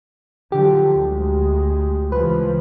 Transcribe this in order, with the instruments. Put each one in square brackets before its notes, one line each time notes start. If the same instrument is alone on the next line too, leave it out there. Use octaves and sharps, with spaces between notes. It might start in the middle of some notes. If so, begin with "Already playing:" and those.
[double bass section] D3 F3 F#3 [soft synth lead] G4
[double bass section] D2 G#3
[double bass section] C#2 E3 F3 [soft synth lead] B4